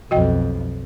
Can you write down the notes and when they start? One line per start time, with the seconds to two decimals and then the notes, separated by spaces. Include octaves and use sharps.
0.11 B1 F2 F#4 D#5 G5